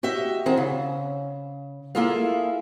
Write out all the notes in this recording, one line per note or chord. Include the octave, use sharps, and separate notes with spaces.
F#4 G4 D#5 E5
D#3 C4 G#4 F#5
C#3
A#3 E4 F4 G#4 A4 F5